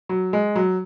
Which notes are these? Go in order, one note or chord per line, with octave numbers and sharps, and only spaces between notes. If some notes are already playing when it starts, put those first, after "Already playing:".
F#3
G#3
F#3